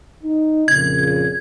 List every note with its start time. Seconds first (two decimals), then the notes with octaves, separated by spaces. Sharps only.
0.23 D#4
0.68 F2 A#2 C#3 G#6